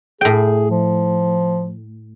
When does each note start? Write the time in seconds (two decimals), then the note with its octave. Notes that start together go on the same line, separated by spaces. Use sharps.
0.21 A2 G#4 G5
0.70 F3